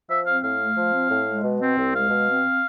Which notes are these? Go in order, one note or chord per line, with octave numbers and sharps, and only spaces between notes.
F3 E5
C4 F5
A2 F5
A3
F3
C4
A2
G#3
B2
C4
C2
G#3 F5
B2
C4